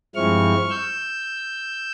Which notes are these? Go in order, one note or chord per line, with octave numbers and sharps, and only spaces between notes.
G2 F3 G#3 C4 E4 C#6 F6
E6 G6